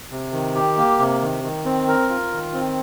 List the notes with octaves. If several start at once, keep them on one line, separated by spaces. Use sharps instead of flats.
C3
D#3
G4
A#3
C3
D#3
D#3
C4
A#4
F4
D#3
C4